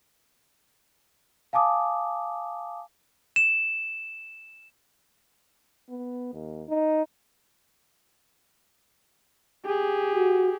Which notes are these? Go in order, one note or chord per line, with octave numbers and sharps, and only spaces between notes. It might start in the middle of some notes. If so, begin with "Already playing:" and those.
F5 G#5 A5 D6 D#6
E7
B3
D#2
D#4
G4 G#4
F#4